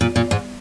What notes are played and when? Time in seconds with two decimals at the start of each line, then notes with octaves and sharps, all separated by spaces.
0.01 A#2
0.16 A#2
0.31 G#2